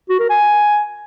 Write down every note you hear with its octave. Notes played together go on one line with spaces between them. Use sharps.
F#4
A#4
G#5